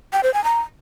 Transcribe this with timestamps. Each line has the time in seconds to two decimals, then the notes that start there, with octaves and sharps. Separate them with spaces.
0.13 G5
0.23 C5
0.34 G#5
0.44 A#5